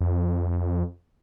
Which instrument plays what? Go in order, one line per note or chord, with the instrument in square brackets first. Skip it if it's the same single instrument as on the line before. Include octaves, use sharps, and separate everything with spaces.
[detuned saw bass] F2